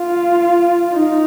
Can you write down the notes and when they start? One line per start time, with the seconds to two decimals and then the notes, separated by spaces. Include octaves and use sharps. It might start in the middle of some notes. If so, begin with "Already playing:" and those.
Already playing: F4
0.95 D#4